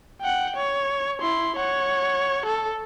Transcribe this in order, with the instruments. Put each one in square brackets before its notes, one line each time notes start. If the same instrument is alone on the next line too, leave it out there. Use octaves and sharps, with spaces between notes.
[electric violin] F#5 G5
C#5
E4 C6
C#5 F#5
A4